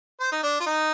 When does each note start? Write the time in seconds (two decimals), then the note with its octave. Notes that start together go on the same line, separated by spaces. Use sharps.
0.20 C5
0.32 D#4
0.44 D4
0.61 F4
0.66 D#4